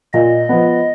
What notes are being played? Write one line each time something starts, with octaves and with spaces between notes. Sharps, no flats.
A#2 D#5
F3 B3